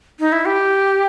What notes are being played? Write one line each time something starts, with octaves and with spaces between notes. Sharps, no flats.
D#4
E4
G4